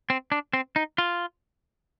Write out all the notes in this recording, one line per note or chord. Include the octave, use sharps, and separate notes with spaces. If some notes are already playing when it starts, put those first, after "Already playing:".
C4
D4
C4
D#4
F4